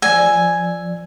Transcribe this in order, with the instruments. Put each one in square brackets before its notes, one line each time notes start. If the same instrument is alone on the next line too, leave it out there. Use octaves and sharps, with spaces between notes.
[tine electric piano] F3 D5 E6 [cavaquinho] G#5